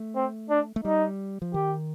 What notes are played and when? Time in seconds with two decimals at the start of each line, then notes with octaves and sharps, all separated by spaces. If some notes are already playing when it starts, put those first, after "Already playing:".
Already playing: A3
0.15 C4
0.50 D4
0.76 A3
0.84 G3 D#4
1.42 F3
1.54 D#3 G4